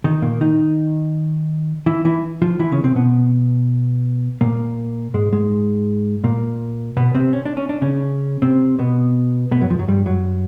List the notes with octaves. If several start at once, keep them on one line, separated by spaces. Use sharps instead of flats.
D#3 D#4
A#2 A#3
D#3 D#4
E3 E4
E3 E4
F3 F4
E3 E4
C#3 C#4
C3 C4
B2 B3
A#2 A#3
G#2 G#3
G#2 G#3
A#2 A#3
B2 B3
C3 C4
C#4
D4
C#4
D4
C#3 C#4
C3 C4
B2 B3
B2 B3
F#2 F#3
F2 F3
F#2 F#3
G2 G3
F#2 F#3